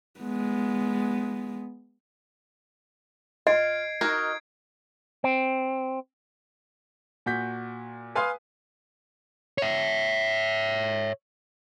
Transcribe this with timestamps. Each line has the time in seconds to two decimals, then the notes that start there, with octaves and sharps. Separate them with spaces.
0.20 G#3 B3
3.47 F4 D#5 G#6 C7 D7
4.01 D#4 F#4 A#4 G#6
5.24 C4
7.26 A#2 F#4 G6 B6
8.15 B4 F5 G#5 C6 D#6
9.58 C#5 E5